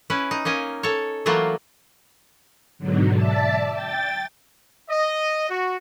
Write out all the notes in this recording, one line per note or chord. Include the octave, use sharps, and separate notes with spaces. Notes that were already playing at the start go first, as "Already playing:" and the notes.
C#4 E4 B4
D#4
A#3 C#4 D#5 G#5
A4 C#5
E3 F#3 A3 A#3 F4
G#2 B2 D3 F#3
D5 E5 A5
G5 A6
D#5
F#4